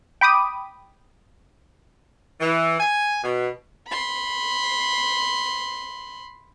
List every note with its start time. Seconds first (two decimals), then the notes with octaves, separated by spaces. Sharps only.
0.21 G5 B5 D6 D#6
2.40 E3
2.80 G#5
3.24 B2
3.88 B5 C6